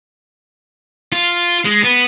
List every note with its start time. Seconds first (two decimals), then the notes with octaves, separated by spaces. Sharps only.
1.12 F4
1.65 G#3
1.83 B3